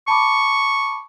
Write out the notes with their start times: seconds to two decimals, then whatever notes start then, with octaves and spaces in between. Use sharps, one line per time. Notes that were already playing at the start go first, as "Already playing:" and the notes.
0.08 A5 B5 C#6 D6